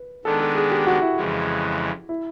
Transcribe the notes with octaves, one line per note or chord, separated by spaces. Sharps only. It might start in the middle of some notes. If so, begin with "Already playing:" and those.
Already playing: B4
D#3 G#3 B3 D4 A4
A4
G#4
G4
F#4
E4
F2 C#3 E3 G#3
E4